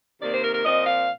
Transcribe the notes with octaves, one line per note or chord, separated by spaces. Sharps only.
C3 D#3 A#3 D5
C5
A#4
A#4
A#2 F3 C4 D#5
F5